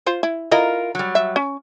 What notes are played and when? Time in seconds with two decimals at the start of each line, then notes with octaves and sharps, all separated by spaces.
0.06 F4 C5
0.23 E4
0.51 E4 F4 A#4 D#5
0.95 F#3 G3
1.15 E5
1.36 C#4